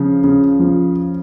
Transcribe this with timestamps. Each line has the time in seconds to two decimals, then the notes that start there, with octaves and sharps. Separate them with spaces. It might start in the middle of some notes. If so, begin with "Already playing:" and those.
Already playing: C#3 F3
0.24 C#3
0.60 F3